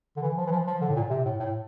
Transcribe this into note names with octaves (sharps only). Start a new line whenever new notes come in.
D3
E3
F3
E3
F3
F3
D3
A2
A#2
C3
A2
A2